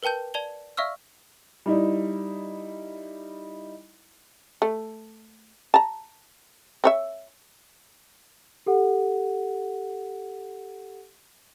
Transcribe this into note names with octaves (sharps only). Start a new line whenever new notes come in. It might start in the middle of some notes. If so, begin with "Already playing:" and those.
A#4 B4 G5 A5 G6
D5 A5 G#6 F7 G7
D5 E5 F5 C#6 E6 F6
G3 D#4 E4
A3
A5 A#5
C4 C#5 E5
G4 A4 F#5